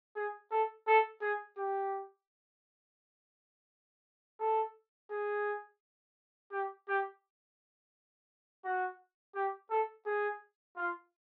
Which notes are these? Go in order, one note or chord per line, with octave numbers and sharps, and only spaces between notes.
G#4
A4
A4
G#4
G4
A4
G#4
G4
G4
F#4
G4
A4
G#4
F4